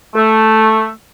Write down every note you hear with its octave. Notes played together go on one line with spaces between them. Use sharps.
A3